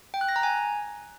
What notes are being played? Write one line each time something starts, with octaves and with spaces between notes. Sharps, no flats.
G5
F#6
A#6
A#5
G#5